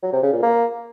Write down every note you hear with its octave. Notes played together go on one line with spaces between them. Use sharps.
F#3
C3
C#3
A#2
A#3